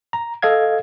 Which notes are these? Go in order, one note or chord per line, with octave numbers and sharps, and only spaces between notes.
A#5
A4 D#5 F5 G#6